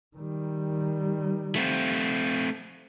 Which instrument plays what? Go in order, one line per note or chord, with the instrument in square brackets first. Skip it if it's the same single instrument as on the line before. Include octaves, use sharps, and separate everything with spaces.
[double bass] D#3 G3
[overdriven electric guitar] A3 C4